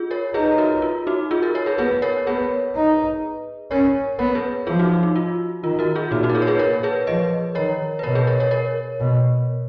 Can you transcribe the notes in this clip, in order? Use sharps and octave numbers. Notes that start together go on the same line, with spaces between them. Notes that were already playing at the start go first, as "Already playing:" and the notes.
Already playing: F4 G#4
A#4 C#5
D#4 G#4 B4
F#4 A#4
F4
D#4 F#4
F4 G#4
F#4 A#4
A#4 C#5
G#4 B4
B3 G#4 B4
A#4 C#5
B3 G#4 B4
D#4
C#4 A#4 C#5
B3 A#4 C#5
G#4 B4
F3 F4 G#4
D#4 F#4
F4
D#4
F4
D#3 F4
F#4 A#4
F4 G#4
A#2 D#4 F#4
D#4 F#4
A#4
F4 G#4
C#5
G#4 B4
A#2 A#4 C#5
G#4 B4
F3 B4 D#5
D#3 A#4 C#5
B4
B2 A#4 C#5
G#4 B4
A#4 C#5
A#4 C#5
A#4 C#5
B2